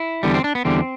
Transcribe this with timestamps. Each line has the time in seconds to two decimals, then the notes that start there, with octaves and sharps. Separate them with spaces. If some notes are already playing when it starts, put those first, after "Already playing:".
Already playing: E4
0.23 E2 D3 G3 B3
0.34 C4
0.44 D4
0.55 B3
0.65 E2 D3 G3 C4